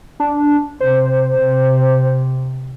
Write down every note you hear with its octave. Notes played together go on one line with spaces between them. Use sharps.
D4
C3 C5
C3